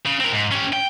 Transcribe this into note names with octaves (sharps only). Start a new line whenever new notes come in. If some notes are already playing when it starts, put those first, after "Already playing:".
C#3
C4 A#4
G#2
C#4 G4
G5